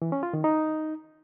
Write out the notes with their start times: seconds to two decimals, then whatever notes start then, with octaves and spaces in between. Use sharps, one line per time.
0.02 E3
0.12 C#4
0.23 F4
0.33 D#3
0.44 D#4